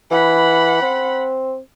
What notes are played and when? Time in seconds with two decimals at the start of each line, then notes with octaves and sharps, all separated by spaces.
0.11 E3 F#5 B5
0.82 C4